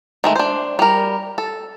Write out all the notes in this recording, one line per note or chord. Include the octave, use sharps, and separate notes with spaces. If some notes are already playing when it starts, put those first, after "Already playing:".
D#3 G#3 A3
D4 C5
G3 A#4
A4